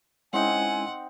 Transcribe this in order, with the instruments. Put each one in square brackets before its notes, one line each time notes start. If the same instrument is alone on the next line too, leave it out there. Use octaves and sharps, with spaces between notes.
[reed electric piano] G#3 C#4 E4 [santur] C4 D#4 [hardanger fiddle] F#5 [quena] G#5